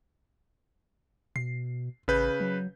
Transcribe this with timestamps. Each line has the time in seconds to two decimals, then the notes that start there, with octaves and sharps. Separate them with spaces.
1.36 B2 C7
2.08 A1 C#3 B4 G6
2.40 F#3